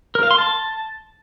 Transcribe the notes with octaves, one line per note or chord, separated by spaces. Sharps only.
A#4
F5
C6
A5